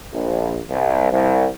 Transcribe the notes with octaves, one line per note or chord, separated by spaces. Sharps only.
A#1
C2
C2